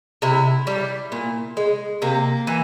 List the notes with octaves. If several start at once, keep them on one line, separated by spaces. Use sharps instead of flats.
C3 E4
G3
A#2
G#3
C3 A#3
E3